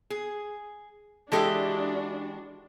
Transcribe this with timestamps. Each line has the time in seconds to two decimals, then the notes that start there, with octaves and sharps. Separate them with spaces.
0.10 G#4
1.32 E3 G#3 D4 F#4 G4 A4 D#5 E5